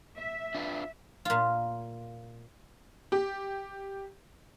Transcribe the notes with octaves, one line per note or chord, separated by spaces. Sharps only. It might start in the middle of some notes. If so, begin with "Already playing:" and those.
E5
D4 F4 B4
A#2 F4
G4